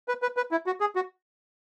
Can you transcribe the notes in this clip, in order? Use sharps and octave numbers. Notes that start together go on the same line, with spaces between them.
B4
B4
B4
E4
F#4
G#4
F#4